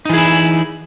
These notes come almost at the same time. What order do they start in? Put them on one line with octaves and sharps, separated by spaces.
D#4 E3 G#4 E4